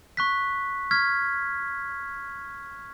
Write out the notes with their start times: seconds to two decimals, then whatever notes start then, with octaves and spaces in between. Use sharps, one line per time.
0.17 C#6 F#6 B6
0.91 C#6 F6 G#6 B6